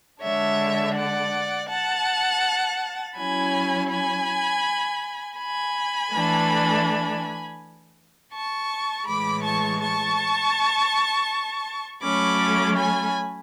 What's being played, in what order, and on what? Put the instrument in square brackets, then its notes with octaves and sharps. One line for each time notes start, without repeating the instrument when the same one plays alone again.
[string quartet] D3 G#3 D4 C#5 E5
D5 F#5
F#5 A5
F#3 C#4 E4 G#5 B5
G#5 B5
G#5 B5
E3 A3 D4
A5 C#6
A2 E3 G#3 B5 D6
A5 C#6
A5 C#6
F#3 A3 C#4 B5 D6
G#5 B5